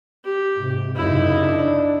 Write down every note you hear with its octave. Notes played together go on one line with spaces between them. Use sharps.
G4
G#2 C3
F#2 C#3 D#4 E4
D4